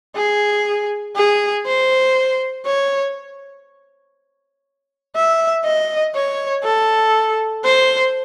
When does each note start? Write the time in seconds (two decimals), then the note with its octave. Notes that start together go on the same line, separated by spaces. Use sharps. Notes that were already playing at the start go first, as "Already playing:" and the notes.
0.16 G#4
1.16 G#4
1.66 C5
2.66 C#5
5.15 E5
5.65 D#5
6.15 C#5
6.64 A4
7.64 C5